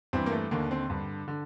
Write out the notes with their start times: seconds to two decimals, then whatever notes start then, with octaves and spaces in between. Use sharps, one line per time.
0.13 G2 E3 C4
0.26 A#3
0.32 A3
0.51 D#2 D3 A#3
0.71 C4
0.90 G2 D3
1.28 D3